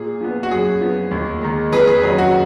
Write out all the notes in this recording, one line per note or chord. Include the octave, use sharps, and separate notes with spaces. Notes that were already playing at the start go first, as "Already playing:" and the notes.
Already playing: A#2 G#4
F3 B3
F#4
F#2 G#4
F3 B3
D#2
D#3 G#3
F2 G#4 B4
G#4 B4
D#3 F#3 C#4 G#4
F#4